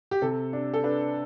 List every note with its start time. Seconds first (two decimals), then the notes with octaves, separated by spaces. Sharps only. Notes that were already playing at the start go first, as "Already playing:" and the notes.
0.11 G4
0.22 C3 A4
0.53 D4
0.74 A4
0.84 D4 B4